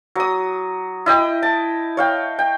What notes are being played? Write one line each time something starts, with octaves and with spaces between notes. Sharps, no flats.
F#3 D#6
E4 D#5 G5
A5
C#5 F5 G5
G5